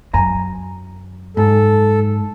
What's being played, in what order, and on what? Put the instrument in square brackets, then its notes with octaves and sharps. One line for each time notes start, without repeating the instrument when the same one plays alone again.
[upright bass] F#2 [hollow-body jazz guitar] G#5 A#5
[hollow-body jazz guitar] G#2 [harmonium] A4